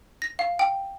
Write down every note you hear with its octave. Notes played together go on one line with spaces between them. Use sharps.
A#6
F5
G5